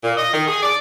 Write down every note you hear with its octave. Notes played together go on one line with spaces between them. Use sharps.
A#2
D#5
D#3
G#4
D5